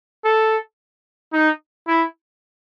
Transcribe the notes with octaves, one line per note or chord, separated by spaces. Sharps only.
A4
D#4
E4